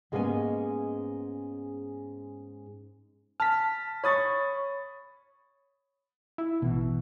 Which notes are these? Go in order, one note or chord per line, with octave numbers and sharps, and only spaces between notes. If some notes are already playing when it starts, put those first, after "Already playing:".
G#2 G#3 A#3 B3 C#4 G#5
A5 F6 B6
C#5 B5 C#6 D#6 A6
E4
A1 B2 E3